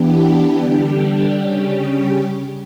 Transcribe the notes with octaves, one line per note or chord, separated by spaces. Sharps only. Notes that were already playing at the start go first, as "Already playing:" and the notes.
Already playing: E3 B3 D4 G4
D3 G3 D4 G4
C#3 G3 C#4 G4